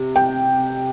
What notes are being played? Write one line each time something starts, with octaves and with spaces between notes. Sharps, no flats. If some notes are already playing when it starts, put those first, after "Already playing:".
Already playing: C3
G5